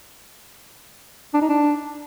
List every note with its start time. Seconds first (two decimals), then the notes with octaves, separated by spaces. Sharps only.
1.34 D4
1.41 D#4
1.49 D4